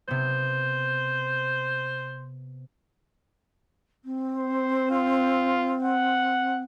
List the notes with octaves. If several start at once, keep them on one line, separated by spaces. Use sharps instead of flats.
C3 B3 C5
C4
C5
F4
F#5